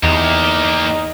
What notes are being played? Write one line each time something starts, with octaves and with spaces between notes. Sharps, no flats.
E2 A#3 D#4 G4